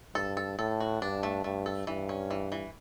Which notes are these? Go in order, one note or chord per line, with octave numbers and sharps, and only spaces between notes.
G2 A4
A4
A2 A4
F#4
G2 D4
A3
G2 A3
A4
G2 E3
C#4
E3
E3